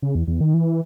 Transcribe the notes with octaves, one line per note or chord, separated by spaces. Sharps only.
C#3
E2
E2
D#3
E3